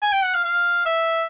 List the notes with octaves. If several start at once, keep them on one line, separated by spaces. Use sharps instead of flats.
G#5
G5
F#5
F5
F5
E5